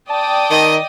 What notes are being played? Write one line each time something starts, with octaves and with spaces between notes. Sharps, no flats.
D5 G5 A5 D#6
D#3 D#5